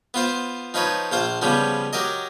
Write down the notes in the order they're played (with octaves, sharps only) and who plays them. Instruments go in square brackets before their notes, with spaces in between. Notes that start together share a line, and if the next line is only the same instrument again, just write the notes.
[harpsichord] B3 F4 C5
F3 D#4 B4 C#5
A#1 F4 C5
C#3 F3 G3 B3 C#4
F#3 G4 A#4 D#5